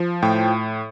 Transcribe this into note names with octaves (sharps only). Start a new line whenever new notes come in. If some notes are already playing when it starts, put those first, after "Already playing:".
Already playing: F3
A2 G5